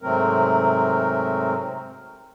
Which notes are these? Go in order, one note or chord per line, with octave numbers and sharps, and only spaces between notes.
G#2 C3 F#3 A3 C4 A#4